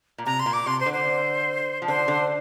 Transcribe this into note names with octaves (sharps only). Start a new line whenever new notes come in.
A#2
C3 A#5
C6
A#2
D6
C3 C6
C5
D3
C5
F3
D3 C5
D3